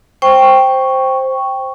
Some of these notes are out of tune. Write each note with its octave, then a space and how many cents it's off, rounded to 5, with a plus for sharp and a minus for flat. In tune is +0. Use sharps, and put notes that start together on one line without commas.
C5 +0 G5 +0 C#6 +0